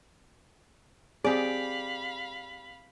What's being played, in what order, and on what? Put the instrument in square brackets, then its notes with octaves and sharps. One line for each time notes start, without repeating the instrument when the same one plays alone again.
[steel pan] C4 G#4 [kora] G4 D5 [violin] F5 B5